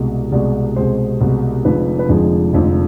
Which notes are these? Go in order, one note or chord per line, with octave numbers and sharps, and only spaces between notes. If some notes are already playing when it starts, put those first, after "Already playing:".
Already playing: C2 B2 G#3
C2 B2 G#3 D5
C2 B2 G#3 C5
C2 B2 G#3
F1 F2 D3 F3 G#3 B4
B4
F1 F2 D3 F3 G#3 G#4
F1 F2 D3 F3 G#3 G#4